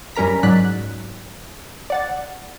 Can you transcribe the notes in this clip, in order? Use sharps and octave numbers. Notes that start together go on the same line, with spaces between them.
F#2 G3 C#4 A#4 A#5 B6
G#2 F#3 D5 F#6 B6
D5 F#5 A6